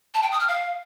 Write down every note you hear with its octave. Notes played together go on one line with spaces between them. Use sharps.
A5
G5
D#6
F6
F5